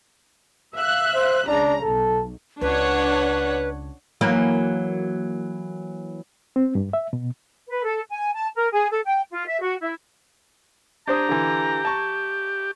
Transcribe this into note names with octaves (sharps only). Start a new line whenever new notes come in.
E5 F5 F#6
C5
C#2 C#3 D4 A#5
B1 A4
C#2 D4 B4 C#5 F#5
E3 F#3 A#3
C4
G2
E5
B2
B4
A4
G#5
A5
A#4
G#4
A4
G5
F4
E5
F#4
E4
D4 G4 C5 A#5 D#6
D3 E3
A5 C#6